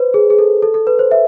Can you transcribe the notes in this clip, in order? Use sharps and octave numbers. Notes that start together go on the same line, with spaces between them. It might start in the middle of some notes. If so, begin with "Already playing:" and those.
Already playing: B4 C5
G#4
G#4
A4
A4
A4
B4
C5
E5